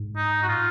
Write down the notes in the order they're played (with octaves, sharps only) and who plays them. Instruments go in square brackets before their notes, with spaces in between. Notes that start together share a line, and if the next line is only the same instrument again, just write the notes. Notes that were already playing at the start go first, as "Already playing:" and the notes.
Already playing: [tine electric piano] G#2
[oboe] D#4
F#4
[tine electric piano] A2 [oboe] F4